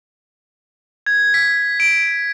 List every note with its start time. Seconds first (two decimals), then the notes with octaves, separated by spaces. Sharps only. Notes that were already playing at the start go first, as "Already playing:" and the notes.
1.06 G#6
1.34 B6
1.80 D7